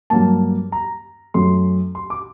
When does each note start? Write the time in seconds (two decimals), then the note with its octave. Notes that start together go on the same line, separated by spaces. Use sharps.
0.10 G2 F#3 A#3 A5
0.72 A#5
1.34 F#2 F#3 A3 C6
1.95 C6
2.10 D6